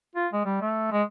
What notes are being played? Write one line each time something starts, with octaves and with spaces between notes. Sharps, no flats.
F4
G#3
G3
A3
G#3